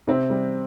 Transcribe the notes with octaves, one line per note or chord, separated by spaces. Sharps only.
C3 C4
G3